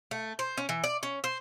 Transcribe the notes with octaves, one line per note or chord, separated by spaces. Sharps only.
A3
C5
C#4
E3
D5
C#4
C5